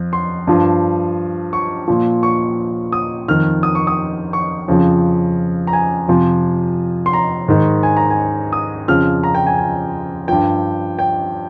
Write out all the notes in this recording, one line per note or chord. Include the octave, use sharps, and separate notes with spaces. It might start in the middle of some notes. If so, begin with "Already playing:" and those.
Already playing: F2
C6
G2 F3
C#6
A#2 F3
C#6
D#6
F2 D#3 F6
D#6
C#6
D#6
C#6
F2 C#3 F3
A#5
G#5
F2 C3 F3
C6
A#5
G#2 D#3
G#5
A#5
G#5
D#6
F2 C#3 F3 F6
A#5
G5
G#5
G#5
G2 F3 G5
G5